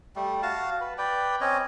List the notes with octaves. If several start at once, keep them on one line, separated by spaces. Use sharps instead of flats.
G3 A3
F#4 F5 A5
B4
B4 D5 G5
C4 C#4 C#5 D#5